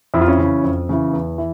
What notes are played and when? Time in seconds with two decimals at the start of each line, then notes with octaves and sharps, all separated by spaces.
0.14 F2 E4
0.21 F4
0.28 C#4 E4
0.38 C#3 E3
0.64 F2
0.89 C#3 E3
1.13 E2
1.38 E3